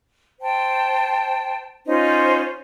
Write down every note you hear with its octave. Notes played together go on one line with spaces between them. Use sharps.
C5 G5 A5
C#4 D#4 F4 C5